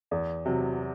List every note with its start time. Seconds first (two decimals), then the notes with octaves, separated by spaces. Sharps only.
0.11 E2
0.45 C3 F#3